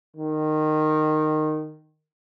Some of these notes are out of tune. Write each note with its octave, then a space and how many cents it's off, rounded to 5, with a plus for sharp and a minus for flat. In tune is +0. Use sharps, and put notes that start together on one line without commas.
D#3 -15